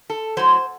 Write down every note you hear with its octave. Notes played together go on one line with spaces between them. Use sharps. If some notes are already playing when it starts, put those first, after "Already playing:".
A4
A2 F#3 C5